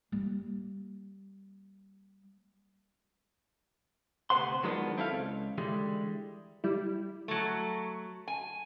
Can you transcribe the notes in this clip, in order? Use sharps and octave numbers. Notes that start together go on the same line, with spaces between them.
G3 A#3
D2 C3 B3 C5 F#5 C6
D#3 F3 F#3 G#3 B3 D4
C4 E4 A4 F5
C#2
D3 E3 G3 G#3
G3 E4
F#3 A3
G#5